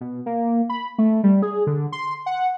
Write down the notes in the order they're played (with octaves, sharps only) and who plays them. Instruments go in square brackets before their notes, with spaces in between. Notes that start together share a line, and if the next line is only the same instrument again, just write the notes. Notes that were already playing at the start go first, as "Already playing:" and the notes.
[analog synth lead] B2
A#3
B5
A3
G3
G#4
D3
C6
F#5